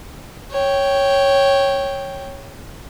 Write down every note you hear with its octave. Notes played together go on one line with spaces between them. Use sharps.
C#5 G5